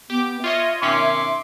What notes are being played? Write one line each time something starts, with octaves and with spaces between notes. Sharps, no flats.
B3 G4 D6
F4 C#5 D#5 E5
D#3 C#4 C6 D6 B6